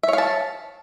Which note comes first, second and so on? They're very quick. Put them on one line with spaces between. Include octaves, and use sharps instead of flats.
E5 C#5 F5 A5